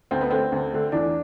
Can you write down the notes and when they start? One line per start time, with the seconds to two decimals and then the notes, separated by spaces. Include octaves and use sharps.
0.11 D2 C4
0.21 B3
0.30 D3 A3 C4
0.52 D2
0.73 D3 A3
0.92 E2 D4